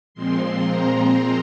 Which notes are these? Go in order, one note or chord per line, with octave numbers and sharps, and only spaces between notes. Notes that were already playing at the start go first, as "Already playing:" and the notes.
A#2 F3 G#3 C4 C6
A#5